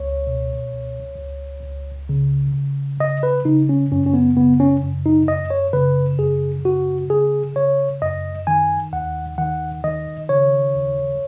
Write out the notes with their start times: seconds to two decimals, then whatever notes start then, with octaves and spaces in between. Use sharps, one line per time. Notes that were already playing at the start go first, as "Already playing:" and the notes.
Already playing: C#2 C#5
0.27 B2
0.73 C#2
1.18 C#2
1.63 C#2
2.09 C#3
2.54 C#3
3.00 C#3 D#5
3.23 B4
3.45 C#3 D#4
3.69 C#4
3.92 F#2 C#4
4.06 C#4
4.14 B3
4.37 C#3 B3
4.60 C#4
4.82 F#2
5.06 D#4
5.28 F#2 D#5
5.50 C#5
5.73 C#3 B4
6.19 F#2 G#4
6.65 C#3 F#4
7.10 C#3 G#4
7.56 C#3 C#5
8.02 F#2 D#5
8.47 D#3 G#5
8.93 D#2 F#5
9.38 D#3 F#5
9.84 D#3 D#5
10.29 C#3 C#5
10.75 D#2